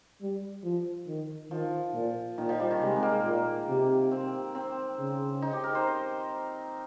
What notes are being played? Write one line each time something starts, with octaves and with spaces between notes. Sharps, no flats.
G3
F3
D#3
D#3 F3
A#2
A#2 D#3
F3
G3
D#3
C3 G#3
G#3
A#3
A#2
C3
C4
C4
C#3
D#4
G4
A#4
C5